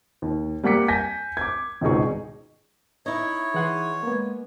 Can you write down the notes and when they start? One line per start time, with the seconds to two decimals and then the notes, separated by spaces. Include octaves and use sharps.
0.22 D#2
0.64 G3 A#3 F#5 D6 B6 C#7
0.88 G#5 G6 A#6 B6
1.37 D6 G#6
1.81 G#1 C#2 B2 D#4 G#4 C#6
3.06 D#4 E4 C#5
3.54 E3 G#4 F#5 C6
4.03 G#3 A#3 B3